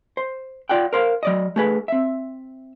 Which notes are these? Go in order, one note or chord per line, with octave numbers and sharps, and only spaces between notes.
C5
F4 D5 F#5 G5
A#4 C5 F5
F#3 D5 D#5
A3 G#4 B4
C4 E5